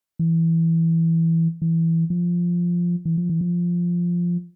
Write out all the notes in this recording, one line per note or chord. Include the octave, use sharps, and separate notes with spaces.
E3
E3
F3
E3
F3
E3
F3